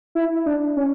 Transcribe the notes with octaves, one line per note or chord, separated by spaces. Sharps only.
E4
D4
C#4